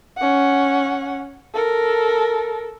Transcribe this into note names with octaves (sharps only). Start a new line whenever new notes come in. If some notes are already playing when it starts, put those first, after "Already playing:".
C#4 F#5
A4 A#4